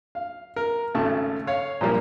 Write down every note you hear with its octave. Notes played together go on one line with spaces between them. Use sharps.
F5
A#4
G#1 C#3 A3 A5
C#5 F5
A#2 F3 G3 A#3